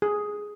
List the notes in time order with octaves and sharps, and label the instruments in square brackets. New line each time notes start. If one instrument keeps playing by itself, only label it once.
[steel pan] G#4